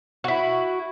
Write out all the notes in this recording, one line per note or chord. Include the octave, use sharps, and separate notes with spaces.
E4 F#4